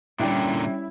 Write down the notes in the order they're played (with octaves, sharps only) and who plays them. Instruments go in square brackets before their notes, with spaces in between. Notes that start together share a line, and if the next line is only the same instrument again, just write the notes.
[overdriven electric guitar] A#2 D3 [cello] G3 C#4 [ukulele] D4 G5 [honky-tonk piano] E4